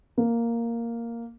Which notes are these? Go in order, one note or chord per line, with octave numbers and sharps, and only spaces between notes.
A#3